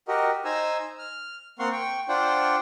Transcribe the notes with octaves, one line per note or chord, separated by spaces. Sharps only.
F#4 G4 A#4 D#5
D#4 C5 G#5 A#5 E6
F6
A#3 C4 F#5 C6 C#6 F6
G5 C#6
D4 F4 C5 F#5 G5